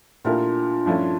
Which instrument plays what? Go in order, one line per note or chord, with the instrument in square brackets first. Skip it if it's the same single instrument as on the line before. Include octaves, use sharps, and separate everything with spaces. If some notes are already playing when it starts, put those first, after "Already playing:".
[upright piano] A#2 A3 E4 G4 A#4 [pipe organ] D4 F4
[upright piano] G2 F3 A3 C#4 E4